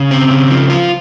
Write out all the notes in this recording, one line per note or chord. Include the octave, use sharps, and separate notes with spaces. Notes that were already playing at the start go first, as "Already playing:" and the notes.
Already playing: C#3
C4
C#3
F3
F4